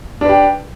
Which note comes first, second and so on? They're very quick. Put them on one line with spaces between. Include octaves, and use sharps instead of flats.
D4 B4 G4